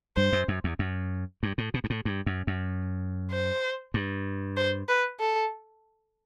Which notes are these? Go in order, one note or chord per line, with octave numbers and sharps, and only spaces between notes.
G2 C5
F#2
F#2
E2
F#2
G2
A2
B2
G2
A2
G2
F#2
F#2
C5
G2
C5
B4
A4